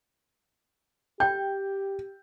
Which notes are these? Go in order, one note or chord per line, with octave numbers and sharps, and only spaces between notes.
G4 G5 G6